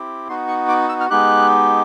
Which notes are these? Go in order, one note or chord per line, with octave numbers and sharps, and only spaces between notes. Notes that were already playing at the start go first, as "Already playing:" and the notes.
Already playing: C4 E4 G4
B3 D#4 F#4 C6
C#6
D6
E6
F6
G#3 B3 D#4 G4 F#6